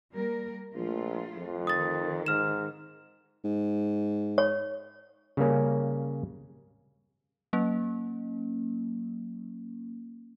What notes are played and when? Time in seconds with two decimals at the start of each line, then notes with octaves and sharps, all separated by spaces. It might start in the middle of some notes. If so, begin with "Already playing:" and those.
0.11 G3 A#3 A#4
0.75 A#1 F3 A3 F4
1.38 F2
1.67 D#3 D#6 A6
2.26 G#2 F6 E7
3.44 G#2
4.38 C#5
5.37 C#3 G3 A#3 C#4
7.53 F#3 A#3 C#4